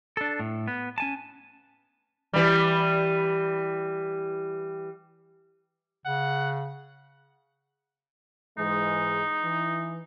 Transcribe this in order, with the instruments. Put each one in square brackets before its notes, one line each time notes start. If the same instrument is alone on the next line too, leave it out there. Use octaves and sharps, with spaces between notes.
[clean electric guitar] D4 A4
A2
B3
C#4 G#5 A5
[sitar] E3 G3
[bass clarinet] C#3 [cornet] F#5
[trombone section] G#2 E3 G#3 [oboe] D#4
[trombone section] E3